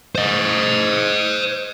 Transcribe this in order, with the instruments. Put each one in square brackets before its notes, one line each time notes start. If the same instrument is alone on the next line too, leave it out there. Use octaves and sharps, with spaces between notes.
[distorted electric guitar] C5 D#5